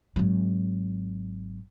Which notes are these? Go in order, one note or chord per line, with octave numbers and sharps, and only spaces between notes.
G#1 F#3